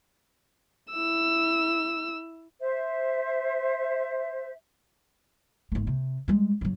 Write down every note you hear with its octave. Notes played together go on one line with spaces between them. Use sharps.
E4 E6
C5 E5
G#1 A3
C3
G3 G#3
G2 F#3